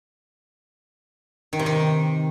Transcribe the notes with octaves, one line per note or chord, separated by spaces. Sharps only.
D#3
C3
D#3